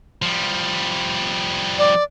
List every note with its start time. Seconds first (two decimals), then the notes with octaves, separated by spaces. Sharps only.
0.22 F3 G3
1.78 D5